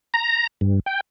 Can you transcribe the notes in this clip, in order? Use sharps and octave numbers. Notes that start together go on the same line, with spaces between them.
A#5
G2
G5